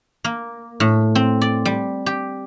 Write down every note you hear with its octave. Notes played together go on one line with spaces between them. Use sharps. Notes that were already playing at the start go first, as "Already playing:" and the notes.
A#3
A2
C4
D5
G3
G4